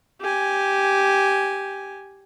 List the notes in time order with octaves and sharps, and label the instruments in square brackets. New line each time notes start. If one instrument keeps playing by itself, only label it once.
[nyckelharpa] G4 G#5